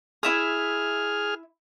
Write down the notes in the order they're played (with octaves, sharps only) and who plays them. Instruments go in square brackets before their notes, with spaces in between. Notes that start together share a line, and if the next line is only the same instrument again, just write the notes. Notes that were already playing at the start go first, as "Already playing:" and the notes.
[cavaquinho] E4 E5 D#6 [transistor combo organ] G#4 F6